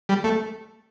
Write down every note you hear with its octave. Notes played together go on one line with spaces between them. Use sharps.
G3
A3